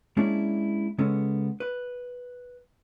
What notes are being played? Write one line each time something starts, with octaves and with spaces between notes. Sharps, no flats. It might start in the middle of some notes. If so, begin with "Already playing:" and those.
G#3 A#3 C#4 D4 E4 G#4
C#3 G#3 B3 C#4 A4
B4